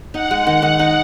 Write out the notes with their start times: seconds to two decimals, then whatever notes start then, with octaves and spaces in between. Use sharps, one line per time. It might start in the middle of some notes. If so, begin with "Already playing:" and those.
0.14 D#4 F#5
0.31 G#3
0.47 D#3
0.62 D#3 F#5
0.79 D#4